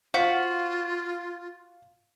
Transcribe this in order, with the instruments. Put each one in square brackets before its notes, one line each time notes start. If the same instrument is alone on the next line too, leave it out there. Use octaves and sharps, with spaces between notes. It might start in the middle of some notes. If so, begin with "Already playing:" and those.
[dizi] F4 [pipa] F#4 [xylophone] C5 F#5 B6 [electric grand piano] F5